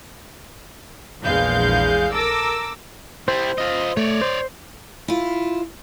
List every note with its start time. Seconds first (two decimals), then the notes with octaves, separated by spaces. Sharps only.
1.22 A#1 E2 G#3 F5 G6
2.13 A4 A#4 D6 E6
3.28 G3 E4 C5
3.58 F4 D#5
3.97 A3 C#5 D5
4.21 C5
5.08 E4 F4